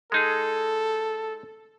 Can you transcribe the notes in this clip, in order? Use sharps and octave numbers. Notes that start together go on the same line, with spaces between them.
G#3 D#4 G#4 A4